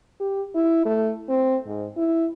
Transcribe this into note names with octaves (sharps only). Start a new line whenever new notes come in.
G4
E4
A3
C4
G#2
E4